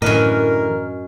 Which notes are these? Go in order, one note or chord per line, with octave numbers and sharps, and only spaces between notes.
F#2 A2 D3 E3 A#4 B4 D#5